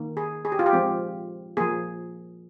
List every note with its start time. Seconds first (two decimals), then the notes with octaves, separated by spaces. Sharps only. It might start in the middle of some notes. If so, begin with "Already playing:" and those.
Already playing: D#3 A#3
0.17 G#4
0.45 G#4
0.52 G4
0.59 F4
0.66 G4
0.73 F3 G#3 C4
1.57 F3 A#3 G#4